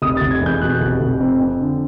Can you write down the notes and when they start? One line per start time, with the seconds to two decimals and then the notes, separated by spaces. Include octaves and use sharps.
0.02 F1 D#6
0.17 F1 A6
0.31 G#6
0.41 E2 G6
0.61 B2 F#6
0.81 F1
1.01 F1
1.20 F2
1.40 F2
1.61 D3